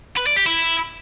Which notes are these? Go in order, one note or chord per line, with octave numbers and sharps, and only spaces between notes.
B4
D5
G4
E4